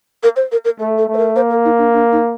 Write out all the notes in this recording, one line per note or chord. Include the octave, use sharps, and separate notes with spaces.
A#4
C5
A#4
A#4
A3 A4
A4
A3
C5
A#4
A#3 C5
A#4
D#4
D4
D4
D#4